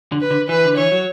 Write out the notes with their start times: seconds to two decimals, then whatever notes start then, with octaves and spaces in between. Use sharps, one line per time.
0.12 D3
0.21 B4
0.31 D3
0.49 E3 B4
0.65 D3
0.77 E3 C#5
0.92 F#3